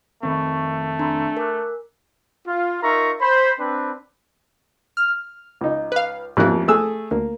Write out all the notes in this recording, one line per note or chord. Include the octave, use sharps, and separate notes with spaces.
F1 D#3 A3 C4 B5 C#6
D4 A#5 C6
A#4 G#5 D6 F#6
F4
D#4 F4 A#4 E5 A#5 C#6
C5 B5
C4 D4 B4
F6
C#2 D#4
B4 F5
A1 F2 G#2 A#3 F#6
A3 G#4 E6
D2 A#3